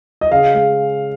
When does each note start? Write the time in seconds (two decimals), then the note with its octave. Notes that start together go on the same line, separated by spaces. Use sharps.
0.21 D#5
0.31 C#3 F5
0.54 G#3